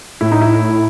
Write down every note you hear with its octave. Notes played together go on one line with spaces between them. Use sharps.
A2 E4
D#4
E4